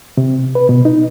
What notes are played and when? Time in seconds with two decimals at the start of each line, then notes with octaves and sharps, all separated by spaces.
0.17 C3
0.55 B4
0.69 B2
0.85 D#4